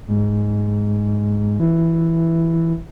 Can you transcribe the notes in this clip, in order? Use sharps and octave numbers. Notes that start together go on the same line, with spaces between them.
G#2
E3